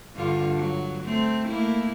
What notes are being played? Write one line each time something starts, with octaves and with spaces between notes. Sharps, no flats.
G2 D3 F4
F#3
A3 C4
A3 A#3 E4